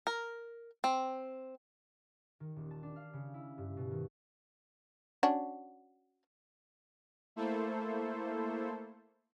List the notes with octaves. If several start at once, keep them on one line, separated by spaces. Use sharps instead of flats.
A#4
C4
D#3
D#1
A5
D4
F5
C#3
E4
G2
B2
D#3
C#4 D4 F#4
A3 A#3 E4 A4 C5